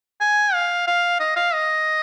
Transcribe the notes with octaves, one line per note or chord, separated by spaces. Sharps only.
G#5
F5
F5
D#5
F5
D#5